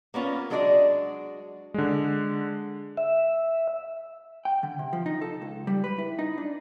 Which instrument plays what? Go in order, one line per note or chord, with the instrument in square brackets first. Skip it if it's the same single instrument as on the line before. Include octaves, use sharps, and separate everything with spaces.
[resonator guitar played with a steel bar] A#3 B3 C#4 F4
F#3 G#3 D4 F#4 D5 D#5
[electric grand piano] D3 G#3
[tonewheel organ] E5
[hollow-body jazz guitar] G5
D3
C3
F3
D#4
A4
C#2
G3
B4
E4
D#4
D4